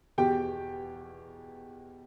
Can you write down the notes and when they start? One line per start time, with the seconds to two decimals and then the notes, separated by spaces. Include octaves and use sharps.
0.18 E2 B2 G4 G5